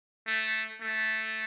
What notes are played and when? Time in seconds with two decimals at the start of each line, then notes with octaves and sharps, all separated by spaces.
0.27 A3
0.81 A3